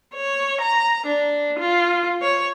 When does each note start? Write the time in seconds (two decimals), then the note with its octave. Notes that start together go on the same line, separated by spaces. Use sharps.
0.15 C#5
0.61 A#5
1.06 D4
1.59 F4
2.22 C#5